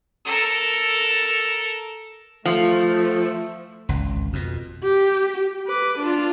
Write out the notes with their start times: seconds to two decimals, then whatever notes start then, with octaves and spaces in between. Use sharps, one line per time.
0.25 A4 A#4
2.45 F3 A3
3.89 G#1 C#2
4.33 F2 B2
4.83 G4
5.67 B4 D6
5.98 D4 F4